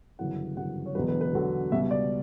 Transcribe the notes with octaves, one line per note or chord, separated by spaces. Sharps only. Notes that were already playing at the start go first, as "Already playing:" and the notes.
G1 F#2 C#3 E3 F#5
G1 F#2 C#3 E3 F#5
C#5
E1 E2 D3 F#3 B4
B4
B4
E1 E2 D3 F#3
C#2 B2 G3 E5
D5